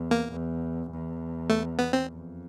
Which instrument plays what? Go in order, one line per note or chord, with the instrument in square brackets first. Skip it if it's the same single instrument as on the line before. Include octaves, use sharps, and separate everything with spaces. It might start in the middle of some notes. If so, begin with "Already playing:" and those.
Already playing: [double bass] E2
[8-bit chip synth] A#3
[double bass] E2
E2
[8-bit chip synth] A3
B3
C4
[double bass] F2